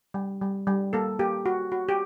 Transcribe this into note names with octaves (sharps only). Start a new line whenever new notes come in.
G3
G3
G3
A#3 A4
A#3 G4
F#4
F#4
G4